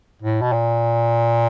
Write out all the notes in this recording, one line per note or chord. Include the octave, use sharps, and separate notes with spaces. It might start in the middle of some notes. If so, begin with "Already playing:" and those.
A2
B2
A#2